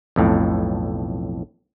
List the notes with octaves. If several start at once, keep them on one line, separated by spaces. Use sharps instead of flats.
B1 F2 A2